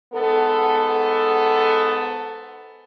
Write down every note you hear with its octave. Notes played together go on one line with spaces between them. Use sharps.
G#2 B3 A4